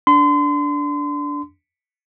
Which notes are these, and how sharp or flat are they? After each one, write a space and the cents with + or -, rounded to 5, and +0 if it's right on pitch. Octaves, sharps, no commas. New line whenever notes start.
D4 -15 C6 -35